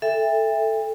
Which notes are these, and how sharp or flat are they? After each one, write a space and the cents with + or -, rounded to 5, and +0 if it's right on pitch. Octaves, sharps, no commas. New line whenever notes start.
A4 +0 E5 +0 G5 +40